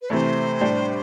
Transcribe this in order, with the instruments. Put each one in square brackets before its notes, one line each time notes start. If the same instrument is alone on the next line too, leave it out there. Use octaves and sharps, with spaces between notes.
[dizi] B4
[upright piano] C3 E3 A3 [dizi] C5 D5
[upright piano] A2 G3 D4 G4